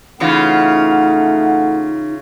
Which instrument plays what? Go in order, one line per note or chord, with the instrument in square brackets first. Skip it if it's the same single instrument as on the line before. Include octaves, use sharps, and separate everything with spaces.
[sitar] C#3 E3 F4 [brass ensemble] A3 F#5 [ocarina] D#4